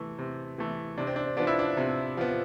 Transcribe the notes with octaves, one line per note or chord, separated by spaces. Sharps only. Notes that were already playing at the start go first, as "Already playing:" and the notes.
Already playing: C3 E3 A3
C3
E3 A3
C3 D4
C4
D4
F3 B3 D4
E4
D4
C3
F3 B3